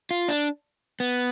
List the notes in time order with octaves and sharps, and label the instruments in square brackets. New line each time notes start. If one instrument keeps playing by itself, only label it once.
[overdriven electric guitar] F4
D4
B3